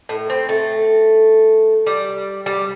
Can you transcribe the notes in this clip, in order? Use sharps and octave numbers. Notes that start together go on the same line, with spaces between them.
A2
C4
A3
G3
G3